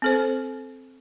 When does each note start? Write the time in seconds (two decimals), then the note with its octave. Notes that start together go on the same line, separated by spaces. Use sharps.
0.02 C4 A4 C5